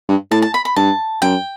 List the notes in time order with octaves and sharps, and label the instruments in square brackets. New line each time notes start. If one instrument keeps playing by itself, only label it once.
[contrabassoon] G2
[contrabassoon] A2 [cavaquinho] A5
[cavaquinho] A5
B5
B5
[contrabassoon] G2 [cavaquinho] A5
[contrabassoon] F#2 [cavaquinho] G5